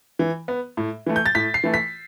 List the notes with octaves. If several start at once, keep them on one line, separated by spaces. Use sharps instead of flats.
E3
B3
A2
E3 A3
G6
A6
A2 B6
C7
E3 A3
B6